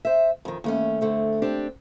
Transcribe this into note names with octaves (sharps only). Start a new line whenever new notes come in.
C5 E5
F2 D#3
D#2 A3 C#4
D3 A3 C4
C4 D4 G4